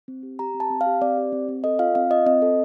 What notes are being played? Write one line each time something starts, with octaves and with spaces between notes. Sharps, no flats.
C4
G4
G4 A#5
C4
A5
C4
F5
G4
C4 D5
G4
C4
C4
A4 D#5
F4 F5
C4 F5
F4 D#5
C4 D#5
A4